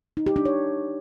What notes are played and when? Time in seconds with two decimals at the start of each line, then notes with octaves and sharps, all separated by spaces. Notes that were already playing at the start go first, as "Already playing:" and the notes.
0.17 D#4
0.26 G4
0.36 D4
0.45 C#5